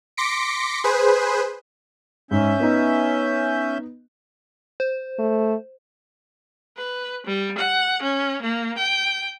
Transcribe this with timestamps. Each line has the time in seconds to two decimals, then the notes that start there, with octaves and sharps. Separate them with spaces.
0.17 C6 D6 A#6 B6 C#7 D7
0.84 G#4 B4 C5
2.31 G#2 C#4 E5 G6
2.60 B3 D#4
4.80 C5
5.19 A3
6.77 B4
7.26 G3
7.58 F#5
8.02 C#4
8.42 A#3
8.77 G5